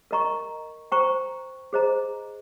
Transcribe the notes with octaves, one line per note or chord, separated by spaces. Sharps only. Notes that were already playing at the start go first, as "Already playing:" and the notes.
A#4 D#5 A#5 C#6
C5 G5 A#5 C#6
G#4 C5 D#5 A#5